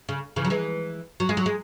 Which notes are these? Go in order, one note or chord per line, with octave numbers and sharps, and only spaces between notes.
C#3
C#3 E3
F#3
E3 G#3
F#3
G#3
F#3
G#3